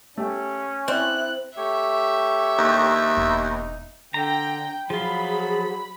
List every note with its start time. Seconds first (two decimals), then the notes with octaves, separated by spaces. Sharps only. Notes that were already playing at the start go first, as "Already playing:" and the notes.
0.18 A3 C#4 G4
0.88 C4 E4 D5 F#6
1.57 A3 G4 C#5 E5
2.58 D#2
3.17 E1 D#4
4.14 D3 G5 A#5
4.90 F3 F#3 F4 G#4 B5